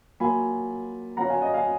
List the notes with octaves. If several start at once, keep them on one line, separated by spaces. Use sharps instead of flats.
F#3 A#3 F4 G#5 B5
F#3 C#4 F4 F#5 A#5
F5 G#5
D#5 F#5
F5 G#5